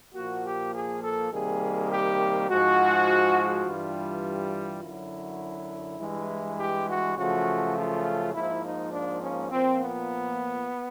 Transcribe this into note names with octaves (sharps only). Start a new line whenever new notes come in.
A#2 F3 A#3 F#4
G4
G#4
A4
C3 D#3 G3 A#3 G#4
G4
G#2 F3 G#3 F#4
G2 E3 G3 F4
F#2 D3 F#3 E4
G2 E3 G#3
G4
F#4
F#2 C#3 F3 A3 F#4
F4
G#2 F3 A#3 E4
D#4
D4
C#4
A#2 F3 A#3 C4
B3